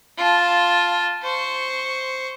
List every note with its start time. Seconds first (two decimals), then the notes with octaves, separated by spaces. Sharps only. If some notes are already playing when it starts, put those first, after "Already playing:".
0.17 F4 A5
1.23 C5 C#6